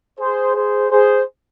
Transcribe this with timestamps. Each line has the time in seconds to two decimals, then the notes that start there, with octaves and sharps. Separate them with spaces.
0.20 G#4 C5
0.55 G#4 C5
0.91 G#4 C5